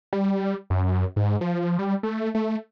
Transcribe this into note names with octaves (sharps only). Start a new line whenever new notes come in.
G3
F#2
G#2
F3
G3
A3
A3